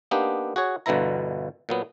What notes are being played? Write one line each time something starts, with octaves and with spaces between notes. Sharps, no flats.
A#3 B3 D4 D#4 G4
F#4 G#4 C#5
G1 B2 D3 E3 E4 A#5
A#2 F#3 B3